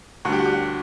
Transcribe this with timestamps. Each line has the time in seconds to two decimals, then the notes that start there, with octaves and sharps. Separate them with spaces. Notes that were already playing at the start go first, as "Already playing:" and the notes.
0.25 D2 F#4
0.27 D3 G3 G4
0.39 F#4
0.46 G4
0.53 F#4